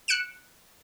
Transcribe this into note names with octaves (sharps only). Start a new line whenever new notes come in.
F#6 C#7 D7 E7